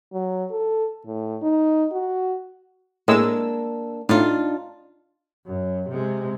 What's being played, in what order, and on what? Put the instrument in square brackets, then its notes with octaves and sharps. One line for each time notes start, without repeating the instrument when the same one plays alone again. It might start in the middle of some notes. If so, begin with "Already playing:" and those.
[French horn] F#3
A4
A2
D#4
F#4
[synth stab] A2 G#3 E6 [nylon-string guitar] A#3 D4
[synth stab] A2 [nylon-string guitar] D4 D#4 F4
[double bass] F#2
C3 G#3